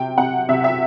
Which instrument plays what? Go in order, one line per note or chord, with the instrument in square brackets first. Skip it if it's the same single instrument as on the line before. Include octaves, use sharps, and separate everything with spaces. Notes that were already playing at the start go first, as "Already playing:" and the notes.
Already playing: [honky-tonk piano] C3 G5
C3 F#5
C3 E5
E5